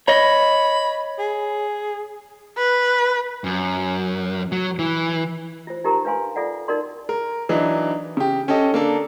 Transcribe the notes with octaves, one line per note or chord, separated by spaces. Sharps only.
C#5 D#5 B5
G#4
B4
F#2
F#3
E3
F4 C5
D#4 F4 G4 A#4 A#5
D4 B4 F5 G#5 C6
F4 A4 D5 F#5
D#4 F4 F#4 A#4 D5 C6
A#4
E3 F#3 D4 D#4
C#3 G4
C#4 G4 A4 D#5
D3 A#3 D4 A4